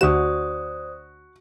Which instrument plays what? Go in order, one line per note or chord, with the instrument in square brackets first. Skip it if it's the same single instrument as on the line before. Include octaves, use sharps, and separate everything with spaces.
[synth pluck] D2 E7 [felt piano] F#4 [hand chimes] C5 D5 D#6